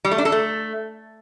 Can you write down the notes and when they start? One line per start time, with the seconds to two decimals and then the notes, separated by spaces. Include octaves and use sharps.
0.05 G3
0.11 A3
0.18 D4
0.25 A4
0.32 A3